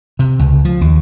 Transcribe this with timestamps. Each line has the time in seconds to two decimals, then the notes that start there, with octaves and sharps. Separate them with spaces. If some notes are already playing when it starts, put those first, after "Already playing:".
0.19 C3
0.39 C#2
0.65 F3
0.81 D#2